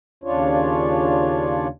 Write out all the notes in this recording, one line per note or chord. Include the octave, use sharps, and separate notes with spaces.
D#2 C#3 D4 F4 C#5